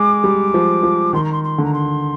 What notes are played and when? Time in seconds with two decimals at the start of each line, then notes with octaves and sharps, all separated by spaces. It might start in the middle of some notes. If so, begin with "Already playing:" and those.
Already playing: G#3 D6
0.24 G3
0.54 F3
0.83 F3
1.13 D#3 C6
1.23 A#5
1.32 C6
1.43 C6
1.58 D3 A#5
1.73 C6